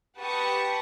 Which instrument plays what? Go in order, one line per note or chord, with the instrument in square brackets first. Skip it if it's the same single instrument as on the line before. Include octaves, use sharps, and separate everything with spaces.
[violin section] G4 B4 F#5 A5 C#6 D#6